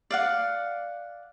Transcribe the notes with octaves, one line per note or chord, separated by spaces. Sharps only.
D5 F5 F#5